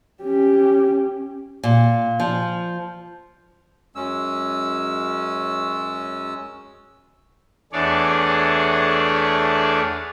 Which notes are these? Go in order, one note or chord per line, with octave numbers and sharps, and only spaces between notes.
C#4 G4
A#2
F3
F#2 G#3 C#4 E6
E2 A3 D4 G#4 C#5 D5